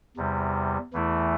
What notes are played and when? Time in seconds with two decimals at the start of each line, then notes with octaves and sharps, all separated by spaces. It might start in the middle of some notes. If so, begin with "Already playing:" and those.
0.17 E2 C3 G3
0.93 E2 E3 A3 E4